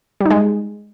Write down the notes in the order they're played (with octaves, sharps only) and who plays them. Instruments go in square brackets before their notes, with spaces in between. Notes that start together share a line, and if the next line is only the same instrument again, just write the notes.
[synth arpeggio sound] G3
D#4
G#3